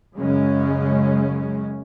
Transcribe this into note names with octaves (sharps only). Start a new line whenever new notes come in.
F#2 C#3 G#3 C#4